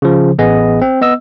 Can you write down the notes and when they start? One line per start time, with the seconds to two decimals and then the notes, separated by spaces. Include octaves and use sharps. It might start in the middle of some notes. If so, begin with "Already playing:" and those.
0.02 C#3 F3
0.38 A1 B3 G#4 D#5
0.82 C4
1.01 B3 D#5 E6